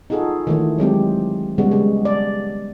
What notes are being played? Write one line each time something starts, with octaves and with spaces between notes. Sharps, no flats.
D#4 F4 F#4 G#4 A4
D#3 E3 A3
F#3 G#3 C4 G4
C#3 G3 G#3 B3 F#4
G#3
D5